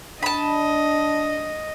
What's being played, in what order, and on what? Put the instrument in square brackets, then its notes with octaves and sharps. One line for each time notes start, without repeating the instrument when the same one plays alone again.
[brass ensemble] D4 [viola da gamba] D#5 [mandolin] A5 B5